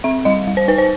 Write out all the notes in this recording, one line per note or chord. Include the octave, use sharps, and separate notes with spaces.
C4 E5
G3 D#5
G3
C5
D#4 B4
C5